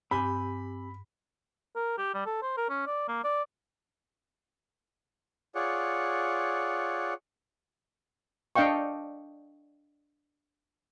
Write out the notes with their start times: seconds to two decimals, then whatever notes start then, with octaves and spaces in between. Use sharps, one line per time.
0.11 G2 C4 G4 G#5 B5
1.76 A#4
1.98 G4
2.14 G3
2.26 A4
2.42 C5
2.57 A#4
2.69 C#4
2.87 D5
3.08 A#3
3.24 D5
5.55 F4 G#4 C#5 D5 F#5
8.56 D4 D#5 F5 G5 C#6